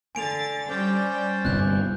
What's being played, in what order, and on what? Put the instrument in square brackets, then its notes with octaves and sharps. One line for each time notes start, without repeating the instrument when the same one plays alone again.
[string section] D3 A6 [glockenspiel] G#5 D7 F7
[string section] G3 G5 [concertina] C#4 C5 D5
[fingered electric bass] G1 G2 C3 [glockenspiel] F#6 G6